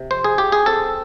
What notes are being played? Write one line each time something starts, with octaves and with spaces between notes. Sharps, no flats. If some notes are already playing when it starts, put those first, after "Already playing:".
Already playing: C3
F2 C5
G#4
F3 G4
G#4
C4 A4